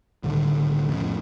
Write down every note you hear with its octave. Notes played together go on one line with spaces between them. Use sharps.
C2 A2 D3 D#3
F2 A2 C#3